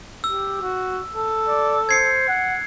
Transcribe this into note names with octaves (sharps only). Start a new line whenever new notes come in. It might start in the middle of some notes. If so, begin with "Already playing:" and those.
G4 E6
F#4
A4
D5
C5 G#6 C7 C#7
F#5